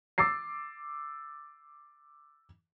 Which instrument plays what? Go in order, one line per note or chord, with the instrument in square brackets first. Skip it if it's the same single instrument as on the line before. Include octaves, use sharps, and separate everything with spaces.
[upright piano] D6 E6 A6 C7